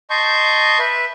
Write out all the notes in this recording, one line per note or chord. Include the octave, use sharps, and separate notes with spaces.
D#5 A5 C6 C#6 G6
B4 E5